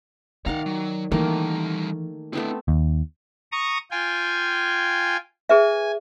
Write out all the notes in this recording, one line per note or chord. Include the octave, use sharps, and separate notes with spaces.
D#3 D#4 D5 F5 F#5 A#5
F#3
D#3 E3 G3 A3 A#3 A#4
A3 B3 C4 D4 E4
D#2
A#5 C#6 D#6
F4 G5 G#5
G#4 B4 E5 G#5